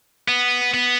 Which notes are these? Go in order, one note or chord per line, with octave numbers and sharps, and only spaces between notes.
B3
B3